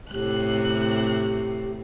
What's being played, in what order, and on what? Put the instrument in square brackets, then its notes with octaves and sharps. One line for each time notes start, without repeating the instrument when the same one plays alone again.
[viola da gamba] A2 C3 [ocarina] G4 [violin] F#6